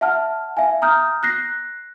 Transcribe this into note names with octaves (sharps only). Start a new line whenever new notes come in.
E5 F#5 A5 F6
E5 F5 G#5
A#5 D#6 F6 G6
F#6 A#6 C7